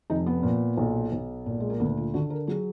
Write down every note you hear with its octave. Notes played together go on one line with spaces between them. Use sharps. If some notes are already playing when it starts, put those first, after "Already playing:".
F1 D#4
B3
A#2
B1
B1
A#2
G#3
A#3
D2 B3
F4
D3 F#4
A#4
F#3 G#4